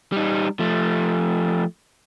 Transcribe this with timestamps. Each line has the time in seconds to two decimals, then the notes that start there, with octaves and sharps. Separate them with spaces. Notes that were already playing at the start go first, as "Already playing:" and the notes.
0.12 G3 D#4
0.60 F3 A3